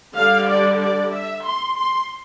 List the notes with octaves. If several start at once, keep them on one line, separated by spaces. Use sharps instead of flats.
D3 G3 D4 F5
D5
D5
E5
C6
C6